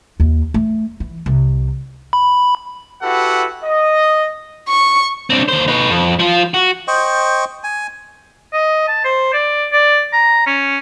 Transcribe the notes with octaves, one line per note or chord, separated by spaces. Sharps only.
D#2
A3
E3
C2
B5
E4 F#4 G4 A4 B4 F#5
D#5
C#6
C4 D4
D#2 C5
D#4 B4
F2
F3 F4
F#4
C5 D#5 G5 C#6
G#5
D#5
A5
C5
D5
D5
A#5
C#4